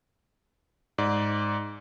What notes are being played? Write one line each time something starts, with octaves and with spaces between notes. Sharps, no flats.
G#2 D5